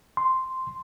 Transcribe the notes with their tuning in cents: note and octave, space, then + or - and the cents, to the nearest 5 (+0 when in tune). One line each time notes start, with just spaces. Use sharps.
C6 -5